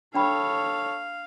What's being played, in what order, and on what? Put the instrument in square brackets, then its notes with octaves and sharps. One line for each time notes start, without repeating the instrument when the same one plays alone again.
[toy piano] D4 G5 B5 [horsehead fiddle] A4 C#5 [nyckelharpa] F5